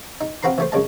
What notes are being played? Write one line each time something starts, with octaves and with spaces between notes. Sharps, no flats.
D#4
C4 F4 F#4 B4 A#5 C6
E3 A3 C5
F#2 C#3 G#3 A5